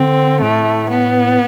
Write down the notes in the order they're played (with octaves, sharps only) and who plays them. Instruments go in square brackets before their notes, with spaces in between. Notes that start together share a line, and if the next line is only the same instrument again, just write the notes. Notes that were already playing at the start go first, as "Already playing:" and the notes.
Already playing: [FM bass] D3 [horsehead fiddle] C4
[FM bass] A2 [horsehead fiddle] A3
[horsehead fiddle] B3